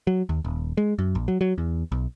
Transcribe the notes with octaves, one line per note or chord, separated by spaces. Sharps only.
F#3
D#2
D#1
G#3
F#2
A#1
F#3
F#3
E2
B1